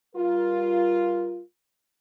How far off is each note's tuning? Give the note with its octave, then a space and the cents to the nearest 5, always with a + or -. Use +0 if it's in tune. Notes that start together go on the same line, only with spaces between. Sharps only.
G3 +0 F4 +0 A#4 +30